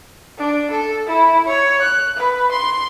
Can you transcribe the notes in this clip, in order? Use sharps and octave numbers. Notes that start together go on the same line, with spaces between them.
D4
A4
E4
C#5
F#6
B4
C6